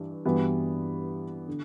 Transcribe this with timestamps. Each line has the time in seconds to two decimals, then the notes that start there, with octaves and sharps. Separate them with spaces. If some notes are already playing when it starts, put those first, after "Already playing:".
Already playing: G2 E3
0.25 G2 E3 G3 B3 F#4
1.48 D3